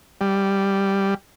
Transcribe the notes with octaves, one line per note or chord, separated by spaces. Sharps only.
G3